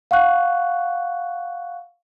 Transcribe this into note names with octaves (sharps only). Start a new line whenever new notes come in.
F5 F#5 C#6 F#6